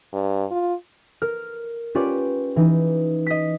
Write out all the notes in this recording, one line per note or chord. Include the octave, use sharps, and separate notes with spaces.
G2
F4
A#4 F6
C#4 F4 G4 B4 C#5 D5
E3 D#4
D#5 B6